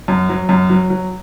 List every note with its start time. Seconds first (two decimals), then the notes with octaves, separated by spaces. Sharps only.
0.08 F#2
0.29 F#3
0.49 F#2
0.70 F#3
0.90 F#3